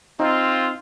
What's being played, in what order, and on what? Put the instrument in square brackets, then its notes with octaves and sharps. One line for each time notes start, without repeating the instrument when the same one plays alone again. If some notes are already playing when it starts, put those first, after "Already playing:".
[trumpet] C4 [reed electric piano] D#4 [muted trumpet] F4